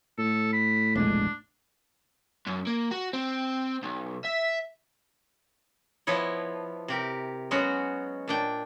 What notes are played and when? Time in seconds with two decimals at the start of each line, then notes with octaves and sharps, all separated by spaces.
0.19 A2 A4
0.53 B5
0.95 E1 A#1 G#3 D4
2.47 F#2
2.67 A#3
2.92 F#4
3.13 C4
3.83 B1
4.25 E5
6.07 F3 B3 E4 C#5 D#5
6.88 C3 G4 A#4
7.51 F#3 G#3 B3 C#4 F#4
8.28 A#2 D4 G5